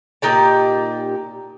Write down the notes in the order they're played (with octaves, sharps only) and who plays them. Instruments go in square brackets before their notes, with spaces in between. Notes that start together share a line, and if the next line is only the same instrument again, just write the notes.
[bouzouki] A#2 D#4 G4 A5